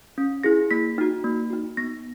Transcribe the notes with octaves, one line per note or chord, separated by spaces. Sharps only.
C#4
E4 G#4 A#6
A#3 B6
D#4 F#4
A#3
D#4 F#4
B3 A#6